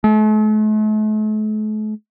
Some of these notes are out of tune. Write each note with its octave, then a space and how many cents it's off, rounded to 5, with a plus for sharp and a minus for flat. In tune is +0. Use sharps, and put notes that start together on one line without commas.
A3 -45